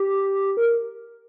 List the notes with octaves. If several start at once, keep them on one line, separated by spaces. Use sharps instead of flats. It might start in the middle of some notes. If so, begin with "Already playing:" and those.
Already playing: G4
A#4